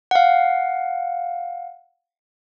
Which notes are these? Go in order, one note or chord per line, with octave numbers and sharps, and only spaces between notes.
F5 F#5